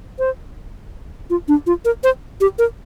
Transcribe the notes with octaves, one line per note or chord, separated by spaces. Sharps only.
C5
F4
D4
F4
A#4
C5
G4
A#4